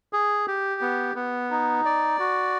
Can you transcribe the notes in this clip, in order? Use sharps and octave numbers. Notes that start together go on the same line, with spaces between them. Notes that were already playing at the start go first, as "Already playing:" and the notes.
G#4
G4
B3
B3
D#4
D5
F#4